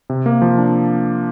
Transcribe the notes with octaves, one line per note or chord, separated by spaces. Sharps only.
C3
A#3
F3
D4